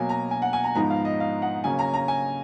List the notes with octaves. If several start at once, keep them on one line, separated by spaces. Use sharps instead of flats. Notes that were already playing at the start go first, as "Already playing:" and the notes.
Already playing: B2 F#3 A#3 G#5
A#5
G#5
F#5
G#5
A#5
G#2 F3 B3 D#4 A#5
F5
D#5
F5
F#5
C#3 F#3 A#3 C#4 G#5
A#5
A#5
G#5